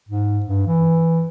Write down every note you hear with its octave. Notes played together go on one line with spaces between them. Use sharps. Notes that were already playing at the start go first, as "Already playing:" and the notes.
G#2
G2
E3